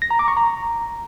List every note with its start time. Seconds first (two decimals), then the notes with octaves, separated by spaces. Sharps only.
0.02 A#6
0.11 A#5
0.19 D6
0.28 C#6
0.37 A#5